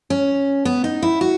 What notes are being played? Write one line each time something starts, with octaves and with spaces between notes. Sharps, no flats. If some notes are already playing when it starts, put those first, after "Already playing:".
C#4
B3
D#4
E4
F#4